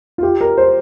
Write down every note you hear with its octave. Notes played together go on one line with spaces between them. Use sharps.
F4
G4
A#4
C5